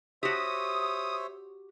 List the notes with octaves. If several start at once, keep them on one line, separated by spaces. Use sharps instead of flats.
F#4 G4 C5 C#5 E5 D#6